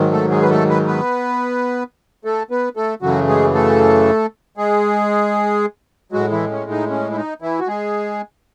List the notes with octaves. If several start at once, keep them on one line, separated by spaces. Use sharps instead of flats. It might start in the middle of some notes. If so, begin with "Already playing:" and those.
Already playing: G#2 D#3 F#3
A3 A4
G#3 G#4
B4
A3 A4
B4
B3 B4
A3 A4
B3 B4
A3 A4
F#2 C#3 E3 F#3 A3 F#4
G#3 G#4
A3 A4
G#3 G#4
A2 F#3 G#3 F#4
E3 E4
C#4
D#4
C#4
E4
D#4
E3 E4
F#4
G#3 G#4